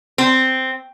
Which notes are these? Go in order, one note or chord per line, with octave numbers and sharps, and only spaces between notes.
C4